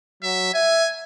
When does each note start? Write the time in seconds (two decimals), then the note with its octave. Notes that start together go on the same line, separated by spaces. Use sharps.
0.23 F#3 E5
0.54 E5 G#5